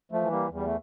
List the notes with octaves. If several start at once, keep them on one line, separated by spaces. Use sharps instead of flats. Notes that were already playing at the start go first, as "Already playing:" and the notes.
F3 A3
E3
G3 A#3
E2
G3
A3